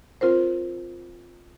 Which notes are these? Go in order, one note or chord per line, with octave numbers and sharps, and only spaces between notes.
C4 F4 A#4 C5